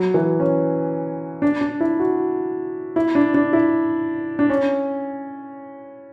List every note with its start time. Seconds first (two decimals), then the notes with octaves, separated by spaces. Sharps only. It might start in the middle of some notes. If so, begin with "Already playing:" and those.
Already playing: F#3
0.14 E3
0.40 C#4
1.42 D4
1.61 D4
1.80 E4
2.00 F#4
2.96 E4
3.15 D4
3.34 D4
3.53 E4
4.39 D4
4.50 C#4